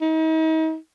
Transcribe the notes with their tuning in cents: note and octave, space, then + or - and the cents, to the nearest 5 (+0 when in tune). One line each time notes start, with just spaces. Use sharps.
D#4 +40